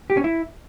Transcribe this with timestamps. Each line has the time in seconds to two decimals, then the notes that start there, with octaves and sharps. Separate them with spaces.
0.10 G4
0.17 C#4
0.24 E4